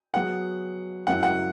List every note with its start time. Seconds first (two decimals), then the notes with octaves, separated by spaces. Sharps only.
0.13 F#3 B3 G#4 C#5 F#5
1.07 F#2 F#3 E4 F#5
1.23 F#5